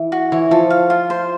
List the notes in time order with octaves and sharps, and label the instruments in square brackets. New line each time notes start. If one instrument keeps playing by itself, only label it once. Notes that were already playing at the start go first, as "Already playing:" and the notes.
Already playing: [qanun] E3
[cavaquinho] F#4
[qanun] E3 [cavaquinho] C#5
[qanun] F3 [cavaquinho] A4
[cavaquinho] F5
F4
C5